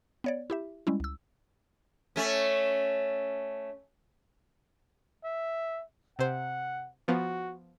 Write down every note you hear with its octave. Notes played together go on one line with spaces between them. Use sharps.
B3 C#5 D5
E4 G4 E5
G3 G#3 C#4 E4
C#2 E6
A3 C#4
E5
C3 C5 F#5
F3 B3 F#4